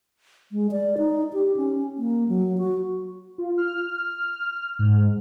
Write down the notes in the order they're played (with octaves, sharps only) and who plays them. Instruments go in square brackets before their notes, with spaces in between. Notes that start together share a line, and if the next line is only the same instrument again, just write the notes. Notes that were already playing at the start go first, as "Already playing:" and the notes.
[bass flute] G#3
D5
D#4
G4
C#4
A#3
F#3
F#4
[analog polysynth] F4
F6
G#2